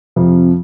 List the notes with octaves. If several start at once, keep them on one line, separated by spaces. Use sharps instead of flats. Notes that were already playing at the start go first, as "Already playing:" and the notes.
F2 C3 F3